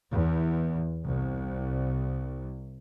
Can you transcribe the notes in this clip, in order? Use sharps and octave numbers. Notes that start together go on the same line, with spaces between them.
E2
C2